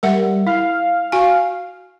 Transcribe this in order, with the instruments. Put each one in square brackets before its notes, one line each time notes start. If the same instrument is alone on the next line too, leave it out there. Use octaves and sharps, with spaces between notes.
[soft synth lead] G3 [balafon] A#4 E5 F#5
[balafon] E4 [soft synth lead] F5
[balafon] F#4 G#5